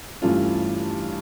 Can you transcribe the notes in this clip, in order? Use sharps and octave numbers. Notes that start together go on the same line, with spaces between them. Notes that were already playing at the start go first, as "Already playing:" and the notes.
G2 E3 A3 C#4 F4